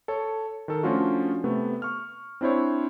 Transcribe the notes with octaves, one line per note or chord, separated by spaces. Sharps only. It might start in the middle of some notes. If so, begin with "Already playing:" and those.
A4 C#5
D#3 A4
F3 A3 C#4 D4 F4 F#4
C3 A3 B3
C#6 F6
C4 D4 E4 C5 C#5